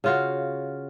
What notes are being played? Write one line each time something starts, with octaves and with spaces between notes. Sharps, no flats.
C#3 F4 F#4